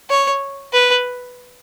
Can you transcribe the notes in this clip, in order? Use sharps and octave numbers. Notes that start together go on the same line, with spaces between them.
C#5
B4